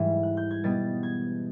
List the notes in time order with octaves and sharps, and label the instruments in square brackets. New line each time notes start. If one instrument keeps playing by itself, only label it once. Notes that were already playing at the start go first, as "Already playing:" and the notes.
Already playing: [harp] G#2 E3 G3
F#6
G6
G#6
B2 G3 B3 A6
G#6